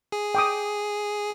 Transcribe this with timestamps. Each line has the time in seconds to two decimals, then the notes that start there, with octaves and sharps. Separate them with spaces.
0.12 G#4
0.35 G5 D6 D#6